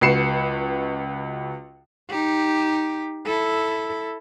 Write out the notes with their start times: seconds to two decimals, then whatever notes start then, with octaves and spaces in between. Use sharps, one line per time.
0.01 C#2 F#4 B4 C7 C#7 E7
2.10 D#4 G4
3.26 E4 A4